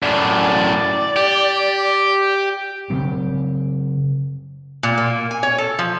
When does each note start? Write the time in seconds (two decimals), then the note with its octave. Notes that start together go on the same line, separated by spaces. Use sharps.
0.03 F#2 A2 D5
1.16 G4
2.90 C#3 F#3 C4
4.83 A#2
4.98 A#3
5.31 G#5
5.43 C#5
5.58 A4
5.79 F3